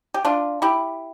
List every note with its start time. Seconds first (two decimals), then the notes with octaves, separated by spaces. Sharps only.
0.14 G4
0.25 D4 F4
0.62 E4 G4